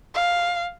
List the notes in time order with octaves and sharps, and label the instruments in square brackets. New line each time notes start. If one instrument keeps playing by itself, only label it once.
[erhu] F5